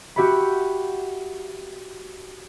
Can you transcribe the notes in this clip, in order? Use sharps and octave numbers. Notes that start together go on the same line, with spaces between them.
F#4 G4 E5 F#5 B5